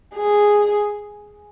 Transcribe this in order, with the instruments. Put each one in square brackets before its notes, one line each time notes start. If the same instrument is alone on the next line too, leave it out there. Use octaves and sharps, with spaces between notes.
[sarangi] G#4